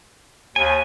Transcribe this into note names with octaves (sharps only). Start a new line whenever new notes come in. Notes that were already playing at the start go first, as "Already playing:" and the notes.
D#2 G#5